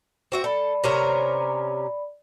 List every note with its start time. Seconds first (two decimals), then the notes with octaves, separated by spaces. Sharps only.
0.32 C4 F#4 E5
0.44 A4 D5 B5
0.84 C3 C#4 A#4